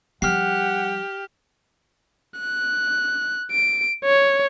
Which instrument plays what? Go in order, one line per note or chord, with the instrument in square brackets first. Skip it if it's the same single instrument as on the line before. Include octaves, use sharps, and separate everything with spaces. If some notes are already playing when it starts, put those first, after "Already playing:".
[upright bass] F3 G3 [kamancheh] G4 [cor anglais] F#5 [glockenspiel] F6 C7
[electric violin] F#6
D7
C#5